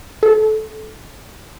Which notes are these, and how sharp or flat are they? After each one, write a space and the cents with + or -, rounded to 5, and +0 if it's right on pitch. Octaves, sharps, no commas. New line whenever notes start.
A4 -20